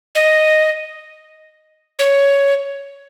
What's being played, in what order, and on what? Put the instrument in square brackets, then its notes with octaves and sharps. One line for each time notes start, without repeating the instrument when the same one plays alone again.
[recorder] D#5
C#5